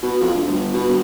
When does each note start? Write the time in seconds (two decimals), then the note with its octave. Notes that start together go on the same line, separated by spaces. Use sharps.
0.03 B2
0.21 F2
0.34 D2
0.47 G1
0.74 B2
0.89 G1